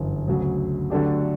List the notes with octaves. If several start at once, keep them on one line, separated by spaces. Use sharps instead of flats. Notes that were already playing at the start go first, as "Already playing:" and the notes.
Already playing: G1 F#2 E3
D2 C#3 F#3
D3 F#3 A3 D4 G4